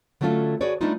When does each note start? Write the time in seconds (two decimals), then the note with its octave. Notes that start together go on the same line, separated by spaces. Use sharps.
0.21 D3 F#3 A3 C#4 F4 A4
0.61 F#4 G#4 B4 C#5 D5
0.81 G3 A3 B3 D4 D#4 F4